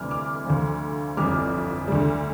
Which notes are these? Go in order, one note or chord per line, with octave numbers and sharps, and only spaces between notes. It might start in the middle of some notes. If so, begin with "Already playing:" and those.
Already playing: D2 C3 E3 G3 D6 F6
D6 F6
D2 D3 F3
G1 F2 E3 G3 D6 F6
D2 D3 G3